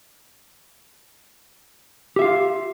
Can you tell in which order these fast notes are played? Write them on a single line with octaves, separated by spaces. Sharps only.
G4 E5 F5 F4